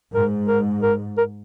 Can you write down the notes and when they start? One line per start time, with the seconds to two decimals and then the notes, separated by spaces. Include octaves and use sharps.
0.14 G#2 A#4
0.48 A#4
0.83 A#4
1.18 A#4